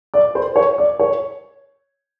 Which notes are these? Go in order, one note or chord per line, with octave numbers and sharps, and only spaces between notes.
D5
C5
C#5
D5
C#5